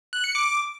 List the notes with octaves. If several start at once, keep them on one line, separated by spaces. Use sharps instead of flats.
F#6
C#7
D6